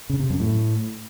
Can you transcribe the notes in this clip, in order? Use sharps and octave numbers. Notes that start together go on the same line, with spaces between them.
C#3
C3
F#2
A2